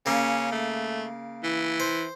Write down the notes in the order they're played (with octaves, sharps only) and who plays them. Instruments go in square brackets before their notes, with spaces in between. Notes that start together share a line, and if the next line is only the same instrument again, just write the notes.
[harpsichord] C#3 A#3 [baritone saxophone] C#4
[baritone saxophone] A3
E3
[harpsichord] C5